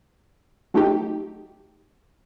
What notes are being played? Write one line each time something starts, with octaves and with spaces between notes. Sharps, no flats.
F#3 A3 D#4 G4